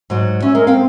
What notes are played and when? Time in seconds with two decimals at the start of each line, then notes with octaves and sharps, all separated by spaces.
0.10 G#2 F#3
0.42 C#4 E5
0.55 G#3 A#4
0.67 C4 F5 G5